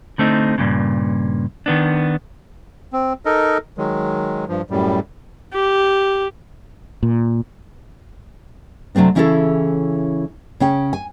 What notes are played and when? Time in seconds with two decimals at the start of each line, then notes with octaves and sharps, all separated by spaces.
0.18 D3 A3 C4 D#4
0.58 G2 A#2 C#3
1.66 D#3 B3 D4
2.93 C4
3.26 D#4 A4 A#4 D#5
3.78 D#3 F#3 G#3
4.48 G2 F3
4.70 F#2 A2 G3
5.53 G4
7.03 A#2
8.95 C3 F#3 A3 C4 D4
9.15 C#3 E3 C#4 E4 G#4 A4
10.60 C#3 C#4 G5
10.93 G#5